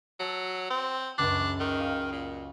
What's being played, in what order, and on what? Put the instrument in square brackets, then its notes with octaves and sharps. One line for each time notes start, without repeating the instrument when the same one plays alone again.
[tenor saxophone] F#3 [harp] A5 E6
[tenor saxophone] C4
[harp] C#2 F#2 [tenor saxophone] D4
[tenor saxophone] D#3
[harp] F5 D#6
[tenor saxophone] A#2